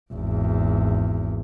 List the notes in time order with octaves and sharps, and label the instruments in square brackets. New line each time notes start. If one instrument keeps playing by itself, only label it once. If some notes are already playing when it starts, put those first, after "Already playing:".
[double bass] G#1 E2